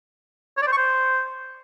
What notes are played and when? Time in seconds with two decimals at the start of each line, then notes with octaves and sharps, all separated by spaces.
0.57 C#5
0.62 D5
0.67 C5
0.72 C#6
0.77 C5